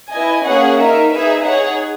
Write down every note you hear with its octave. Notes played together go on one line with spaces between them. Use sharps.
E4 B4 D#5 G#5
A#3 C#4 G#4 C#5 F#5
D#4 A#4 E5
D#4 G#4 B4 E5
D#4 G#4 C#5 F#5